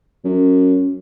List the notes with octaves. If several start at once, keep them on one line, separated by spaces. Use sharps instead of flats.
F#2